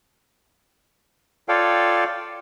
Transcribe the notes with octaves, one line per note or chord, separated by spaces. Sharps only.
F4 A4 C#5 D5 F5 G5